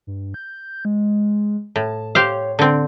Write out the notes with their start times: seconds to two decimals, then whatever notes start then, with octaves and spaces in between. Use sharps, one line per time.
0.07 G2
0.34 G6
0.85 G#3
1.76 A2 A5
2.15 G4 C5 C#5 F5
2.59 D3 C4 D4